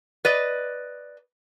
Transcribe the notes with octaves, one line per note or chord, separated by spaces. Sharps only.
B4 D5 D#5